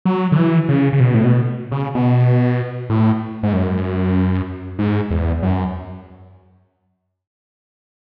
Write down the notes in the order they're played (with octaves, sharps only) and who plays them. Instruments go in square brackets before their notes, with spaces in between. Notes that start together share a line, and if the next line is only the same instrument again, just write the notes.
[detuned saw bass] F#3
D3
E3
C#3
C#3
B2
A2
B2
C#3
B2
A2
G#2
F#2
G#2
E2
F#2